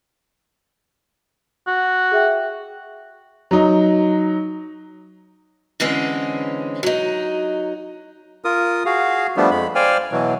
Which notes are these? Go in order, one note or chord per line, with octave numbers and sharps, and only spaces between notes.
F#4
G#4 E5 G5
F#3 D#4
D3 E3 G#3 C4 C#4
F#3 D#4
F4 A#4 D#6
F#4 G#4 F5
F3 G3 A3 B3 D4
F2 G#3 B5
C5 D5 F5 G5 G#5 F6
B2 E3 F#3